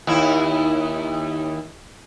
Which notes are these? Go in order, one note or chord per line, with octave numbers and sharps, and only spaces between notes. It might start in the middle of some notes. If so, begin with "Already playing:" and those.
D#2 E4